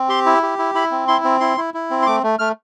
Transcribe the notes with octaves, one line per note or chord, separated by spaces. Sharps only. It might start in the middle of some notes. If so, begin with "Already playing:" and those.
Already playing: C4
G4 C6
E4
G4
E4
E4 B5
C4
E4 C6
C4
E4 C6
E4
E4
C4
C6
A3 D6
A3
A3 F6